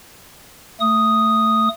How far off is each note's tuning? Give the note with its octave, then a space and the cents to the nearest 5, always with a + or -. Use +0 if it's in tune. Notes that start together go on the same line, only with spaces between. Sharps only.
A3 +15 D#6 +0